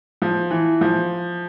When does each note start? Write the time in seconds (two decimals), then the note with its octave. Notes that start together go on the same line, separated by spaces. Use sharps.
0.22 F3
0.51 E3
0.81 F3